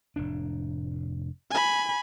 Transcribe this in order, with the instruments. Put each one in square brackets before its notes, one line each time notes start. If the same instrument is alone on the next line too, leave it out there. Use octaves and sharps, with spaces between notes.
[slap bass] F1 A2 D4
[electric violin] G#5 B5